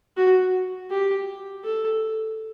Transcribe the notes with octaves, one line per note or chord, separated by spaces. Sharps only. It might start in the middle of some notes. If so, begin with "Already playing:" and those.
F#4
G4
A4